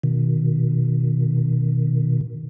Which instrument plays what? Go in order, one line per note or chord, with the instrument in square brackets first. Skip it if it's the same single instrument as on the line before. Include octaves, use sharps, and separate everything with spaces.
[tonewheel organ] B2 D#3